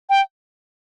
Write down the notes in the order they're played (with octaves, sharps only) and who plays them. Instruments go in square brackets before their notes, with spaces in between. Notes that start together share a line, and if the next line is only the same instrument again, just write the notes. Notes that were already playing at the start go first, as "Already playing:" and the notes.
[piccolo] G5